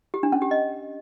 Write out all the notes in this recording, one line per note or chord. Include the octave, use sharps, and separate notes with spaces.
G4
D4
C#4
G4
D#5